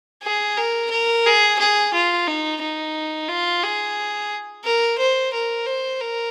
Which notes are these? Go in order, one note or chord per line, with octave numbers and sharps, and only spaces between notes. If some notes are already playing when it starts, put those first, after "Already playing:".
G#4
A#4
A#4
G#4
G#4
F4
D#4
D#4
F4
G#4
A#4
C5
A#4
C5
A#4